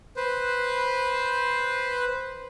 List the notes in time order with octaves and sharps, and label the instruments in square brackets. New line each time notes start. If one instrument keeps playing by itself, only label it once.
[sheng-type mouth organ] B4 C5